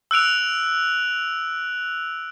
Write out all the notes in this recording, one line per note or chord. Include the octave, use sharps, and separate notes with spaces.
E6 F#6 D7 F7